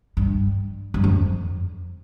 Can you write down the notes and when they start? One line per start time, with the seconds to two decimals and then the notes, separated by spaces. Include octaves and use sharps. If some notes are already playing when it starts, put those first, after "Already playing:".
0.17 G2
0.94 G2
1.04 F2